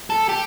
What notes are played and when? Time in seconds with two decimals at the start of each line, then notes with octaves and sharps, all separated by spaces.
0.10 A4
0.29 G4